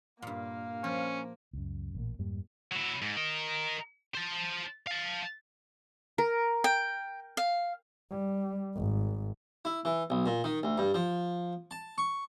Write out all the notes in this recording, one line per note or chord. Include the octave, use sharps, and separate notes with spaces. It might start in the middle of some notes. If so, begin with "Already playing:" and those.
G2 A#2 A#3 F5
F3 C#4
C#2 F#2
A1 A#2 A#3
F2 G#2 G3 A#3
F#3 E4
G#2
A#4 D#5
C5 A5
F5 A5
A#4
G5
F5
G3
G#1
E4
E3
B1
A#2
D#3
D2
G2
F3
A5
C#6